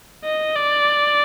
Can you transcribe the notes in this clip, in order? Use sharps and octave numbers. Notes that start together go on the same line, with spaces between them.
D#5
D5